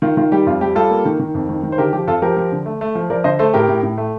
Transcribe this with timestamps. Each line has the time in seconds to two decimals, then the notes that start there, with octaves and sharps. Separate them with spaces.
0.02 D#3 F4
0.17 D#3 F4
0.32 G3 G4
0.46 F2 F4
0.61 G3 G4
0.75 G3 F4 A4
0.91 A#3
1.05 D#3
1.19 D#3
1.34 F2
1.49 D#3
1.63 D#3
1.72 C5
1.78 D3 G4 A#4
1.93 F3 G4
2.07 F2 F4 A4
2.22 F3 G4 A#4
2.36 F3
2.52 D3
2.66 A3
2.81 A3
2.95 F3
3.10 F3 A#4 D5
3.24 D3 C5 D#5
3.39 A3 A4 C5
3.53 A2 G4 A#4
3.68 A2
3.83 A2
3.98 A3